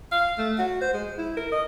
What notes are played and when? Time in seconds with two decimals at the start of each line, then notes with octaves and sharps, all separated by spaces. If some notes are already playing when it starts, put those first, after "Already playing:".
0.12 F5
0.38 A3
0.58 F#4
0.82 C5
0.94 G#3
1.18 E4
1.37 A#4
1.52 D#5